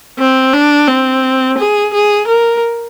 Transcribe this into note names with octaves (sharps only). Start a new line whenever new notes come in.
C4
D4
C4
G#4
G#4
A#4